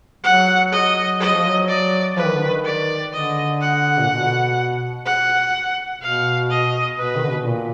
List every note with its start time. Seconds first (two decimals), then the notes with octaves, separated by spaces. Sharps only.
0.24 F#3 F#5
0.72 D#5
1.20 F#3 D#5
1.34 F3
1.47 F#3
1.68 D5
2.16 F3 B4
2.25 D#3
2.34 D3
2.43 D#3
2.65 D5
3.12 D3 D#5
3.61 F#5
4.00 A#2
4.10 B2
5.06 F#5
6.02 B2 F5
6.50 D#5
6.98 B2 B4
7.16 D#3
7.23 D3
7.30 B2
7.46 A#2